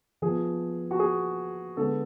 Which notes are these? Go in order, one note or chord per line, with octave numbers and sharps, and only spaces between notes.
F3 B3 G#4
F#4
G#4
D3 G#3 B3 A4